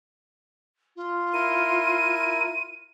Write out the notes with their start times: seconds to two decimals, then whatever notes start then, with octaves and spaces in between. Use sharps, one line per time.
0.96 F4
1.34 E4 A#4 D#7